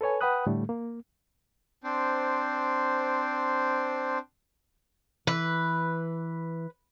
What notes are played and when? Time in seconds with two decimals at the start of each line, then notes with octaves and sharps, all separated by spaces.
0.01 A4 B4 C#5 G#5
0.21 B4 F#5 G5 B5 D#6 F#6
0.47 A2 D3 G3 A3
0.69 A#3
1.84 C4 D4 C5
5.27 E3 B4